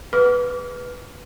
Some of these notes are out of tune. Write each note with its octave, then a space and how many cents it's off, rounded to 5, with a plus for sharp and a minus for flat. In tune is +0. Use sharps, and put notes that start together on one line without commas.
G#4 +0 B4 +0 D6 -35